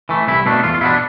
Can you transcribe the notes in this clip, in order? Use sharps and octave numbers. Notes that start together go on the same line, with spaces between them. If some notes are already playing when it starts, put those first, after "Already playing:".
E3 A3
C2 E4
B2 A3 D4
E2 F4
F4
B2 B3 D4 E4